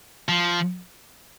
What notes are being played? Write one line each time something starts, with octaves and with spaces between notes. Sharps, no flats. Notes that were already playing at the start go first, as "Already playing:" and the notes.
F3